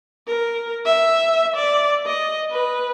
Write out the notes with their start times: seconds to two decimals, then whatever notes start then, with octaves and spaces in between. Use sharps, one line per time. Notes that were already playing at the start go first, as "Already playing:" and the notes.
0.27 A#4
0.86 E5
1.56 D5
2.06 D#5
2.51 B4